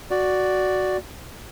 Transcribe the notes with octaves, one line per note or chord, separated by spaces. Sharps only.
F#4 D5